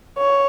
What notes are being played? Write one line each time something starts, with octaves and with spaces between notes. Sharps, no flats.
C#5